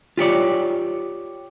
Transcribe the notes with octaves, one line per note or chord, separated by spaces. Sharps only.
F4 G4 C#5 D5